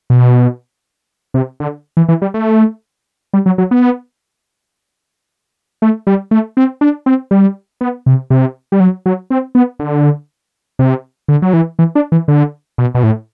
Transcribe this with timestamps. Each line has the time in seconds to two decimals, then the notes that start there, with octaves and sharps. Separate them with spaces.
0.10 B2
1.34 C3
1.60 D3
1.97 E3
2.09 E3
2.22 G3
2.34 A3
3.34 G3
3.46 F#3
3.58 F#3
3.71 B3
5.82 A3
6.07 G3
6.31 A3
6.57 C4
6.81 D4
7.06 C4
7.31 G3
7.81 B3
8.06 C3
8.30 C3
8.72 G3
8.80 F#3
9.06 F#3
9.30 C4
9.55 B3
9.79 D3
10.79 C3
11.28 D3
11.42 F#3
11.53 E3
11.79 E3
11.95 D4
12.12 E3
12.28 D3
12.78 B2
12.95 B2
13.03 A2